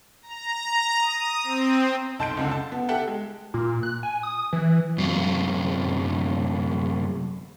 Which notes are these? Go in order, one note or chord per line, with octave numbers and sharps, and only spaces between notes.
A#5
D#6
C4
B1 A5 C6 G6 D7
C#2 F#2 D3
A5
B3
G4 A4 E5 F#5 G5
G#3
A#2
F#6
G#5
D#6
E3
F#2 C3 F#3 F4